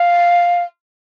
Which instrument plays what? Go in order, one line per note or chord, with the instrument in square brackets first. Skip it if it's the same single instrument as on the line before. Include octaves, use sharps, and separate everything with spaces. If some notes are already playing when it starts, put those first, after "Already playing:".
Already playing: [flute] F5